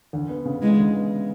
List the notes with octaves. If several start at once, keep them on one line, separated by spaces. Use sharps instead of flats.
D2
B3
C#3
E3 G#3
D2
B3